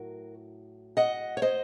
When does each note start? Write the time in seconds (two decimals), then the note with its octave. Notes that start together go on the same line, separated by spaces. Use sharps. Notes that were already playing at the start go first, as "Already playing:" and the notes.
Already playing: A2 F#3 F#4 A#4
0.97 D#5 F#5
1.37 C#5
1.42 C5 D#5